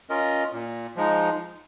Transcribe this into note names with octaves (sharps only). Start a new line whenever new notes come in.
C#4 F4 A#4 D#5
A#2
F3 G#3 D#4